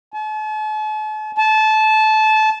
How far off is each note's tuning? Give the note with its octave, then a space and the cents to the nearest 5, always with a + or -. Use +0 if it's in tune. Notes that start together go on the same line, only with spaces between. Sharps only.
A5 -45
A5 -20